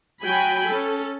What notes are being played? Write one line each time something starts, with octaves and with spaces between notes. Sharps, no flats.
F#3 F#4 G5 G#5 B5
C#4 A4